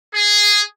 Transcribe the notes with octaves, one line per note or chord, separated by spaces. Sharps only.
G#4